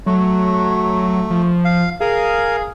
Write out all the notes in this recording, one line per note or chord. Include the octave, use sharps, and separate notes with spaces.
F#3 A3
F3
F5
G#4 A#4 F5